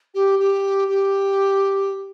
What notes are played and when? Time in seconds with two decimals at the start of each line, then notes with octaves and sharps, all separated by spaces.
0.14 G4
0.39 G4
0.88 G4